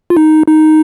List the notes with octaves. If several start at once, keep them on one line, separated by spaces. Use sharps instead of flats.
F4
D#4
D#4